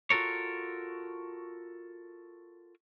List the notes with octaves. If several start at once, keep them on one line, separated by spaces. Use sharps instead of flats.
F4 F#4 A4 A#4 C#5